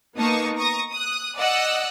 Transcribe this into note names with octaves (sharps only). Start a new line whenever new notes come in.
A#3 B3 D#4 A5 C#6 D#6
A#5 C#6 D#6 A#6
D#6 F#6
D5 D#5 F#5 E6 F#6